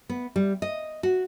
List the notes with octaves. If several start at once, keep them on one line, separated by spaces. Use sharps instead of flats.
B3
G3
D#5
F#4